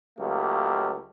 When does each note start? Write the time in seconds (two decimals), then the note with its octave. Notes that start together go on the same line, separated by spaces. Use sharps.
0.19 C#2 F#3 A3 A#3 G4